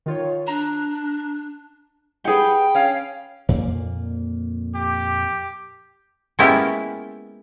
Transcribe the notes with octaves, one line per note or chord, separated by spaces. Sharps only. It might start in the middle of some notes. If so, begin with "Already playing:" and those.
D#3 F4 C#5
D4 A#5
G4 G#4 B4 F#5 G5
C#4 F5
F2 A#2 A#3
G4
G#3 A#3 B3 C#4 E4 G4